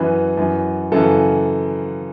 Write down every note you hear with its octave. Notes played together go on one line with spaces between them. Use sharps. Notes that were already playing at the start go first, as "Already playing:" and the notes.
Already playing: F#2 E3 B4
F#2 E3
F#2 C#3 E3 A4